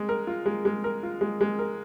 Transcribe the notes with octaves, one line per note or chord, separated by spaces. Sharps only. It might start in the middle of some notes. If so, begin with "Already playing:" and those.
Already playing: G#3
A#4
F4
G#3
G#3
A#4
F4
G#3
G#3
A#4